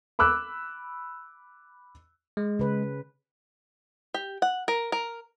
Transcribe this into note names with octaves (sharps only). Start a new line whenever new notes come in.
B5 D6 E6 F#6
G#3
C#3 B4
G4
F#5
A#4
A#4